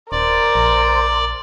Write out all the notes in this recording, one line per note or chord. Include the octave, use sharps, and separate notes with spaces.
D#1 A#4 C5 D5
A#1